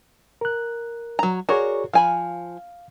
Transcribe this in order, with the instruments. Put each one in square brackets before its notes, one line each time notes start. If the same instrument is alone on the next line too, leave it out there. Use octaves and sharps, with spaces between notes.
[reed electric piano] A#4 F#6
[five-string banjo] F#3 A#5
[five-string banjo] F#4 A#4 [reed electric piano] G#4 C#5 D5
[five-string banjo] F3 G#5 B5 [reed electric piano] F5